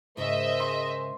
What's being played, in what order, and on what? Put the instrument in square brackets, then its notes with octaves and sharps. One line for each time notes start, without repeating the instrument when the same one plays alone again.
[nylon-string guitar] G#2 C#3 [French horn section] G#3 A#4 C5 [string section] D#5 E5
[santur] C6